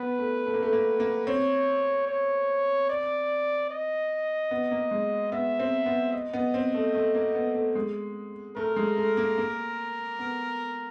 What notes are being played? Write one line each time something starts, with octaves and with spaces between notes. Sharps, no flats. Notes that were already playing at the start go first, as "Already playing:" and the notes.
Already playing: B3 B4
A3
A3
A#3
A3
A#3
A#3
C4 C#5
C#5
D5
D#5
B3
A#3
G#3
B3 E5
C4
B3
D#5
B3
C4
A3
A3
A#3
B3
A3
G#3
A3 A#4
G#3
A3
A#3
A#3
B3